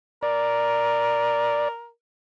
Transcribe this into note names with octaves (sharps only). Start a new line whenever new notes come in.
A#4 D5